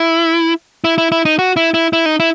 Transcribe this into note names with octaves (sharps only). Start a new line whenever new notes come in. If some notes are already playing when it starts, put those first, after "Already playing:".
Already playing: E4
E4
E4
E4
D#4
F#4
E4
E4
E4
D#4
E4